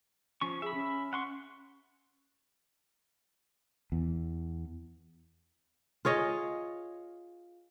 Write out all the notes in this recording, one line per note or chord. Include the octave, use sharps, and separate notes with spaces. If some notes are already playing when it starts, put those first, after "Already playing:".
F3 C#4 C#6
G#4 E5 B5
C#4
F#5 C6 C#6
E2
F4 G#4 C#5 D#5